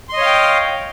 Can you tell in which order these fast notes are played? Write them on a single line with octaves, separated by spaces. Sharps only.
C6 D#5 C#5 F5 G5